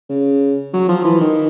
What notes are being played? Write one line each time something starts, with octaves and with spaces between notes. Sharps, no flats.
C#3
F#3
F3
E3
D#3